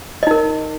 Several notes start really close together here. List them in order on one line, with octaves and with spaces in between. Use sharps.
D#5 D#4 A#4